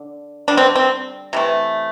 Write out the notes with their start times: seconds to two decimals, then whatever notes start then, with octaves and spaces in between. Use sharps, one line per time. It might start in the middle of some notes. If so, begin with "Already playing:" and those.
Already playing: D3
0.48 D3 G3 D4
0.57 C4
0.75 C4
1.33 C3 E3 A3